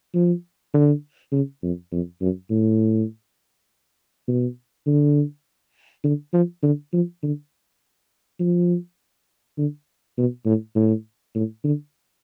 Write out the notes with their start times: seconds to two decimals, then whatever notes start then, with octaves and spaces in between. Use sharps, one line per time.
0.15 F3
0.74 D3
1.32 C#3
1.63 F2
1.92 F2
2.21 F#2
2.50 A2
4.28 B2
4.87 D3
6.04 D3
6.33 F3
6.63 D3
6.93 F3
7.23 D3
8.40 F3
9.58 D3
10.18 B2
10.46 A2
10.75 A2
11.35 A2
11.64 D3